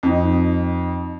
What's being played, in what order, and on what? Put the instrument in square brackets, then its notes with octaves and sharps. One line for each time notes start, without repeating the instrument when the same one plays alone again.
[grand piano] F2 D#4